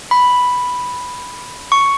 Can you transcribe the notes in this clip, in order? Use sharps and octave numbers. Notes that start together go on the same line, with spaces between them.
B5
C#6